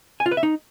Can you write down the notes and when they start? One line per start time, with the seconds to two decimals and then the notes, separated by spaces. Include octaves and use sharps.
0.20 G#5
0.26 F4
0.31 B4
0.37 E5
0.43 D#4